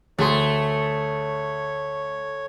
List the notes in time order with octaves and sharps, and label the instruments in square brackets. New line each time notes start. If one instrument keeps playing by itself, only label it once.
[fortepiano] D2 G#4 C6 [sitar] A3 [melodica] C#5